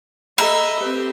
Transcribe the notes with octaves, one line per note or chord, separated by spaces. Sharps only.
A4 D#5 E5 A#5 B5
C4 G4 B4